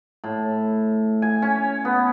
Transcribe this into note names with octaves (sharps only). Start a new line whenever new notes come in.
A2
G#5
C#4
B3